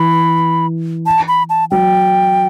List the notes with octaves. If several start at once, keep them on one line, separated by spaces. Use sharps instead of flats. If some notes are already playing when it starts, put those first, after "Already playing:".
Already playing: E3 B5
A5
B5
A5
F#3 G5